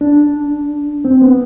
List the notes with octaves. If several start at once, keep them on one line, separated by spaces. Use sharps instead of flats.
D4
C4
B3